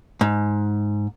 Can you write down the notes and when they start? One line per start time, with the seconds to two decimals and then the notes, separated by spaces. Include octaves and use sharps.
0.21 G#2